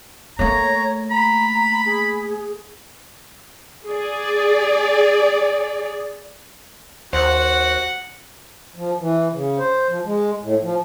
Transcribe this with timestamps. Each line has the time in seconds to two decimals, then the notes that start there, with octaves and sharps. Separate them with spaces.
0.39 A3 A#3 C#5 A#5
1.10 A#5 B5
1.86 G#4
3.88 G#4 D5
7.13 D#2 F#4 C5 F#5
8.76 F3
8.99 E3
9.33 C#3
9.59 C5
9.89 F3
10.05 G#3
10.43 A2
10.63 F3